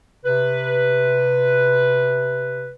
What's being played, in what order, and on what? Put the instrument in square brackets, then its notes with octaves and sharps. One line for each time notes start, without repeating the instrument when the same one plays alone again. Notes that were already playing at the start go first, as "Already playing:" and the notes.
[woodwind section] C3 B4